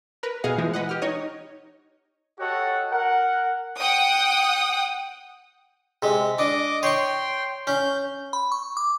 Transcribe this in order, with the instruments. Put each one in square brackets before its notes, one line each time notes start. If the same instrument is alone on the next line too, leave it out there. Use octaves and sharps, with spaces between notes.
[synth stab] A#4 B4
B2 G#4 D#5 F5 F#5
E3 F3 G#3
B4 D#5 F#5
G4 F6
D#4 C#5 D#5
[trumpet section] F#4 G4 A4 C#5 D#5 F#5
A#4 F#5
[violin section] F#5 G5 D#6
[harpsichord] C3 G#3
[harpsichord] D4 [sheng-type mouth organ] D#5 D6
[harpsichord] C#5 C#6 [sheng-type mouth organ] G5 C6
[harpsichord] C#4 [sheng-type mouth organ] G6
[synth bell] B5
C#6
D6